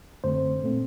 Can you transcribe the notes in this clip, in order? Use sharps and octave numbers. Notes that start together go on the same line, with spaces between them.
F#2 D3 A3 C4 C5
A#2 A3 C4